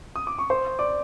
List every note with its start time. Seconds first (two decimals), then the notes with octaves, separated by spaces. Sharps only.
0.16 D#6
0.27 D6
0.39 C#6
0.50 C5 C6
0.79 D5 D6